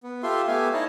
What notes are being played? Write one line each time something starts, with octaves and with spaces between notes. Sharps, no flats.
B3
F4 G4 A4 E5 C6
A3 B3 G4 E5 F5 G#5
D#4 E4 C#5 D#5 A5